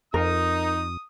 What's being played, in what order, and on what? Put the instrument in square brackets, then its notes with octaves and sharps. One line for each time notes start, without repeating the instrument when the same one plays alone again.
[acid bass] F2 [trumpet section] D#4 [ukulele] A#4 [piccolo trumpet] D#6